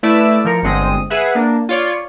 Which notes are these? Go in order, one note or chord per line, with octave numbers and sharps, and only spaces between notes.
A3 E4 B4 D5 E5 E6
F3 A#4 C#7
G1 D3 G#3 C4 D#6
G#4 B4 E5 F#5
A#3 D4
F4 C#5 D5